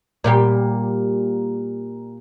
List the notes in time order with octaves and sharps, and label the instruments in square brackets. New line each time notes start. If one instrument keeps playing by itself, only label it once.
[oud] A#2 G3 G4